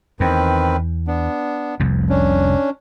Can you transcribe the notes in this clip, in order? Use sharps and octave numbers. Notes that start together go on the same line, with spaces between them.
E2 D#3 C4 B4
B3 D4
F1 C2 F2
C#4 D4